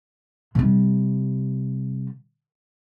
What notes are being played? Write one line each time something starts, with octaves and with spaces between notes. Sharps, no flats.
C3 G3